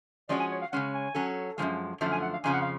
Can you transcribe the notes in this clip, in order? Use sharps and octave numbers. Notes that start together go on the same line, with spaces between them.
F3 G#3 C#4 F#4 D5
G#5
C#5
F5
C#3 G#3 C#4 F#5
G#5
F#3 C#4 F#4 A4
F#2 C#3 F3 G#3
F#2 D3 F3 A3 A5
G#5
F#5
F5
F2 C#3 F3 G#5
F#5
F5